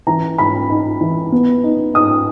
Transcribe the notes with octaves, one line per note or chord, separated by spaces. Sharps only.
E3 A#5
G#2 B5
D#4
E3
B3
D#4
D#4 D#6